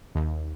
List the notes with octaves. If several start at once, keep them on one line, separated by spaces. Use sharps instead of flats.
D#2